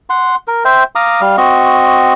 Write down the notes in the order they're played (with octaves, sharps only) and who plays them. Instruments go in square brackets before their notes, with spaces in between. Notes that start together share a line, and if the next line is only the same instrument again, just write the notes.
[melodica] F#5 C6
A#4
C5 E5 G5
F5 A#5 D6 D#6
G3 F5
C4 F#4 D#5 C#6